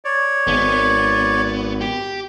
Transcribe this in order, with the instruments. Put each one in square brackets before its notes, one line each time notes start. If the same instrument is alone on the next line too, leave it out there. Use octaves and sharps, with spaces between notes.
[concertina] C#5 D5
[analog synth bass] G#1 [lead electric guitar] B3
[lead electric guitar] G4